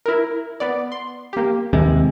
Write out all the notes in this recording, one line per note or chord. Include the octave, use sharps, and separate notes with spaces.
E4 A#4
B3 D5
C6
A#3 G4
D#2 C3 G#3